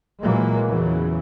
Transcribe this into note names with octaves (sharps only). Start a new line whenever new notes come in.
A#2 E3 F#3 G#3 A#3
E2 C#3 E3 F#3